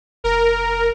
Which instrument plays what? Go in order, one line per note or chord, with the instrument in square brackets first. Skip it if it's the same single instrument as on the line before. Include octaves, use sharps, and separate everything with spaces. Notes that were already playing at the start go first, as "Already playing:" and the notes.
[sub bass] F1 [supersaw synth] A#4